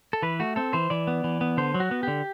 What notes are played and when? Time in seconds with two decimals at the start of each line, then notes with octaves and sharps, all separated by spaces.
0.13 A4
0.22 E3 B4
0.40 A3 F#4
0.56 C4 A4
0.73 E3 C5
0.90 E3 D5
1.07 B3
1.24 E3
1.41 B3
1.57 D3 C5
1.74 F#3
1.80 F#4
1.91 B3
2.03 D3 G4